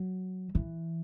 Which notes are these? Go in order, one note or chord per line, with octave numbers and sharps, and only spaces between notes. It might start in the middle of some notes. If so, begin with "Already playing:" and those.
Already playing: F#3
E3